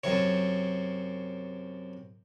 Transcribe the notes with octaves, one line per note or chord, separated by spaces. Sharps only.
F#2 C3 C#5